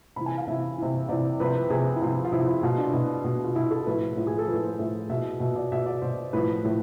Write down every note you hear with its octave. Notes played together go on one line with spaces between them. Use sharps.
C3 E3 B5
G#5
F5
C3 E3 E5
C3 E3
C3 E3 D5
C3 F3 B4
C5
B4
C3 F3 G#4
E4
C3 F3 F4
F4
C3 F3 E4
E4
B2 F4
D4
B2 E4
B2
F4
B2 E4
A4
A2 F3 B4
A2 F3 F4
G#4
A4
A2 F3 B4
C5
A2 F3 E5
B2 E5
B2 E5
D5
B2 E5
D5
B2 C5
A2 F3 B4
A2 F3